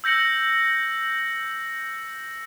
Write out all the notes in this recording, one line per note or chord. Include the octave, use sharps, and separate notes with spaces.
E6 G6 A#6 C#7 F#7